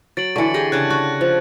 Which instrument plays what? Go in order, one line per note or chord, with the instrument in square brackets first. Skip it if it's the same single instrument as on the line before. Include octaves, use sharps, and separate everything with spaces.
[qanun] F#3 [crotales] A6 D7 F#7
[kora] D3 E3 [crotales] C#6 C#7
[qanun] G4 G#4 G5 [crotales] A#6
[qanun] C#3 D4 A5 [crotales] F#6 G#6 D7
[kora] F#4 [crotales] F#6
[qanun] F3